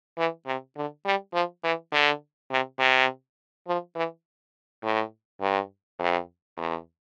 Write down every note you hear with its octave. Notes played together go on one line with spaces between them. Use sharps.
E3
C3
D3
G3
F3
E3
D3
C3
C3
F3
E3
A2
G2
F2
E2